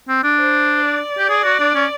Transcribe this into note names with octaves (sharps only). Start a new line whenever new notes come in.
C4
D4
C5
D5
G4
G#4
F#4
D4
C#4